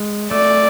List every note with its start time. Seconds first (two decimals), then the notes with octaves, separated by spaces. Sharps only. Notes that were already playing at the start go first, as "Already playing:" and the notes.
Already playing: G#3
0.31 A3 D5